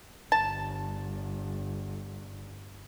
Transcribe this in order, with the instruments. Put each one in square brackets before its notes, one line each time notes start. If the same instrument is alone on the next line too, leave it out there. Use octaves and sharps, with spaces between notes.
[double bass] G1 [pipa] A5